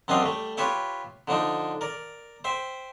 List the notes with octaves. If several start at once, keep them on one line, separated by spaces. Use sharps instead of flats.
F#2 C4 D4 G4 D#5 F5
G3 A3
F4 G4 B4 C#5 E5 G5
D3 F3 D4 D#4
A#4 D5
C5 E5 G5